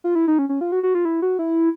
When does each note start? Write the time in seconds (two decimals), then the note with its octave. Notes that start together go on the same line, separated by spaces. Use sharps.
0.04 F4
0.15 E4
0.28 D#4
0.39 C#4
0.49 C#4
0.61 F4
0.72 F#4
0.83 F#4
0.95 F4
1.05 E4
1.22 F#4
1.39 E4